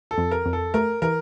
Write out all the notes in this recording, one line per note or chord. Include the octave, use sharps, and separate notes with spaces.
A4
F2
A#4
F2
A4
A3 A#4
E3 A#4